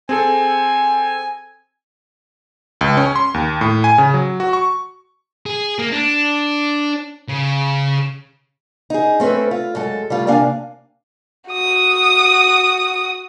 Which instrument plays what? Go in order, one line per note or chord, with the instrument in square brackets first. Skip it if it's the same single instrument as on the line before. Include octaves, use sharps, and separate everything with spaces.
[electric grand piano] C4 G#4 A4 [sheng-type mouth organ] G#5
[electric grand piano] C#2
C#4
C6
D#2
A2
G#5
C#3
F#3
F#4
C#6
[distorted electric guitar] G#4
A#3
D4
C#3
[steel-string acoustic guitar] D#4 G#4
A3 C4 C#4 B4
F4
F#2 G#3 A4
G3 A3 F4
C3 A#3 D4 F5 G#5
[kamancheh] F#4 D#6